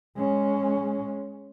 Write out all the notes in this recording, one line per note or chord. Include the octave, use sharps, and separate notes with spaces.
G#3 C#4